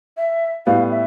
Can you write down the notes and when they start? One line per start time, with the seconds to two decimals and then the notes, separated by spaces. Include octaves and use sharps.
0.17 E5
0.66 A2 G3 B3 F5
0.91 E5